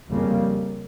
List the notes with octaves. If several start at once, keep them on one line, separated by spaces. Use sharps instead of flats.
F2 C#3 G3 A#3